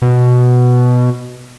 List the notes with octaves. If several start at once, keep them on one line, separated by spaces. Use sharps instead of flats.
B2